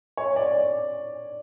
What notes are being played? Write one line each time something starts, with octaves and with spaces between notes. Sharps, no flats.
C#5
D5